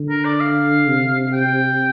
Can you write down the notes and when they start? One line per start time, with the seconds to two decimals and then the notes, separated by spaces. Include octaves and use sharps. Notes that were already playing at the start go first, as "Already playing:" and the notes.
Already playing: D3
0.09 A#4
0.25 D5
0.41 F5
0.88 C3
1.33 G5